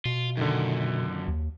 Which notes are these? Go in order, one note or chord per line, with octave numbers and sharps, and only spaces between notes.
B2 F4
F#2 A#2 D3 D#3
D#2